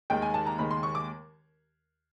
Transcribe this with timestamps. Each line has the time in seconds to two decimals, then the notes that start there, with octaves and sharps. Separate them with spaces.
0.10 D#2 D#3 G#3 G5
0.22 G#5
0.34 A5
0.46 A#5
0.58 D#2 D#3 G#3 B5
0.71 C6
0.83 C#6
0.95 D6